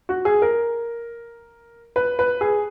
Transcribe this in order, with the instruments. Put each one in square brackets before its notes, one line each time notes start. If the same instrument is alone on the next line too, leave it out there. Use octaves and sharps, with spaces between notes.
[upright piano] F#4
G#4
A#4
B4
B4
G#4